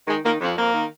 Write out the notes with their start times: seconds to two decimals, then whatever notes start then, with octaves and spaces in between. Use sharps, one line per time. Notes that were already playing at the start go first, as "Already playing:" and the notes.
0.07 D#3 G#3
0.23 D#3 A#3
0.40 F2
0.57 F2 A#3
0.73 D#3